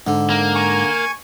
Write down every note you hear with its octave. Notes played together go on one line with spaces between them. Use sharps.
G#2 D3
A#3
G#5 C#6